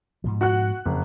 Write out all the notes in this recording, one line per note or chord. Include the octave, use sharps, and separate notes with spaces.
G#2 B2 F3
F#4 F#5 F#6
F#1 F2